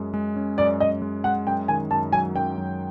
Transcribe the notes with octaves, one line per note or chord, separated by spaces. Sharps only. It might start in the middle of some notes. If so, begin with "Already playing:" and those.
Already playing: F#2 G#3
G#3
C#4
F#2 D5
F#2 D#5
G#3
G#3 F#5
F#2 G5
D#3 G#5
F#2 A5
F#3 G#5
F#2 G5
F#2